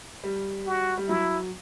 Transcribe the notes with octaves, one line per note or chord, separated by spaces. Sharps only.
G3
F#4
G3
F#3 E4